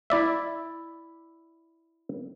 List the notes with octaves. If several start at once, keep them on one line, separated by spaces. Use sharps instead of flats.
E4 D5 E5